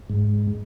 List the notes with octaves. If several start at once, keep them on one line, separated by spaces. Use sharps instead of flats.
G#2